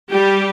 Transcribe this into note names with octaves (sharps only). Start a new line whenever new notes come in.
G3 G4